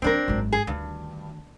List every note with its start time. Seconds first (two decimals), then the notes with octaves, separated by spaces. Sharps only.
0.02 F3 A#3 C4 D4 A#4
0.28 G#1 F#2
0.52 G#4
0.67 D2 G2 D#3